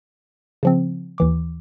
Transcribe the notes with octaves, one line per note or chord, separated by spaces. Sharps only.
C#3 F3 C4
D#2 E3 D6